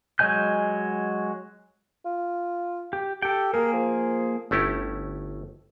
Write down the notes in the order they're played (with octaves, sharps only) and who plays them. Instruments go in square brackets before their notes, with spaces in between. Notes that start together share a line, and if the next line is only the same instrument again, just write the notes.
[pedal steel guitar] F#3 G#3 D#5 G#5 G6
[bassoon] F4
[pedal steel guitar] G4
[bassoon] G4 [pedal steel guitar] A4 G5
[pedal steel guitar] A#3 G#4 [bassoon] A#4
[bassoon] F3
[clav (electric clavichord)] G1 A3 C#4 E4 G4